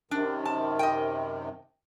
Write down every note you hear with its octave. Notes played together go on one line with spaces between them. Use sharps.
F#2 C3 D#3 D4
A5
D#5 G5